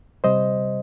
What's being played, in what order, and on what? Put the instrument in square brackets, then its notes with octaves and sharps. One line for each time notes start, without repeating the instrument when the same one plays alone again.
[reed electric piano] C3 G3 C5 D#5